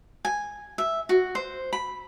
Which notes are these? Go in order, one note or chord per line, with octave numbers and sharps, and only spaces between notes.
G#5
E5
F#4
C5
B5